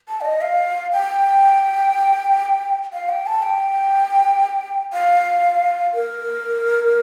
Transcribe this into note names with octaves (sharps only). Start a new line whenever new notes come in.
A5
D5
D#5
F5
G5
F5
G5
A5
G5
F5
A#4